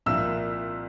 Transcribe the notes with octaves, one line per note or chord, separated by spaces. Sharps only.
C2 A#2 F3 E6